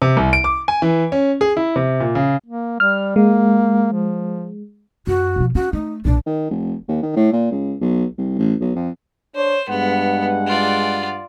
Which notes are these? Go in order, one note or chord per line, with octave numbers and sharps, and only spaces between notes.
C3
C2
D7
D6
G#5
E3
C#4
G#4
E4
C3
A#2
C#3
A#3
G3 F6
G#3 A#3
F3
F#2 F#4
B2 F3
C#4 F#4
A3 D#4
B1 A#2 D4
D#3
F1
D#2
D#3
A2
A#2
C#2
B1
C2
A1
B1
F2
D4 C5 C#5
G2 G#3 B3 F#5
F4 D5